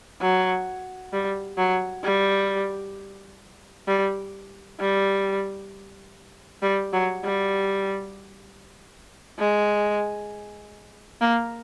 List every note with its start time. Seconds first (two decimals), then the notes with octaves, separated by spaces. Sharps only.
0.21 F#3
1.12 G3
1.57 F#3
2.04 G3
3.87 G3
4.80 G3
6.62 G3
6.93 F#3
7.24 G3
9.38 G#3
11.21 A#3